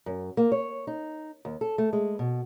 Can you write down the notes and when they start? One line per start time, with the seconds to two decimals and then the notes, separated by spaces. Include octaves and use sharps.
0.06 F#2
0.37 A#3
0.52 C#5
0.87 D#4
1.45 D#2
1.61 A4
1.78 A3
1.93 G#3
2.19 B2